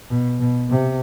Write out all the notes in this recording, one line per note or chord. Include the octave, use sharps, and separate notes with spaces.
B2
B2
C3